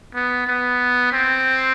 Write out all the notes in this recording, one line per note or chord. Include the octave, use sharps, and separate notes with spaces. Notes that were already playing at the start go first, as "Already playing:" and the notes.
B3
B3
C4